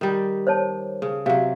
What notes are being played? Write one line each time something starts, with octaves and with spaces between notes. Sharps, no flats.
D#3 G3
C5 C#5 A5
C#3
C3 F#3 F5